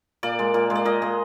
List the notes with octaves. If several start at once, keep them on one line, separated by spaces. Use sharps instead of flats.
A#2 D5
G#3
A#2
G#3
D5
A#2 D#5
G#3